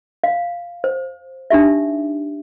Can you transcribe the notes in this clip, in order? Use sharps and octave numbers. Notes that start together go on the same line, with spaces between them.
F5
C5
D4 D#4 G4 E5